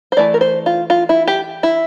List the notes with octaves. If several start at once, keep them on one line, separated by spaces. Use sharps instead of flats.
C5
E3 A3 D5
A#4
C5
F4
F4
E4
G4
E4